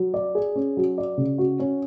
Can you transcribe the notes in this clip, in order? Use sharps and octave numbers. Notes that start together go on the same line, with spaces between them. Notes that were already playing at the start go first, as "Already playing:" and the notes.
Already playing: F#3
D5
G#4
C#4
F#3
D5
C#3
F#4
C#4